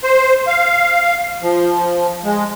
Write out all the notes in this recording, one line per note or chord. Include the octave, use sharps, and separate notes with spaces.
C5
F5
F3
G#3